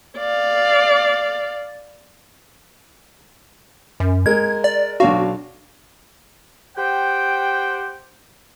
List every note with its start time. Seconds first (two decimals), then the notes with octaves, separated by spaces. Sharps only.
0.17 D5 F5
4.00 F#2
4.26 G#3 A#4 G#6
4.64 D5
5.00 B1 D4 F#4 F5
6.77 G4 C5 F#5 G5